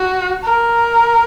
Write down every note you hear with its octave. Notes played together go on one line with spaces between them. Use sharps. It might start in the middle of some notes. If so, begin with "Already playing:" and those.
Already playing: F#4
A#4